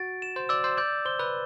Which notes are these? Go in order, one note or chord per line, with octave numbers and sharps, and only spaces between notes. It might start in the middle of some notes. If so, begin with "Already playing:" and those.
Already playing: F#4 A6 D7
E7
C5
D5 E6
C5
D5 G6
C5 G7
B4